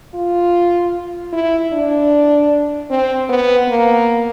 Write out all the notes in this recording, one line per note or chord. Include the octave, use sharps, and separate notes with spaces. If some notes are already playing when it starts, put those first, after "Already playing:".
F4
E4
D4
C4
B3
A#3